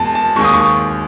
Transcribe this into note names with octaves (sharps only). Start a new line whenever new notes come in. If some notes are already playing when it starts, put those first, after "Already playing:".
Already playing: E2 B2 G#3 A5
A5
D#2 D#3 G#3 C#6
D#6
C#6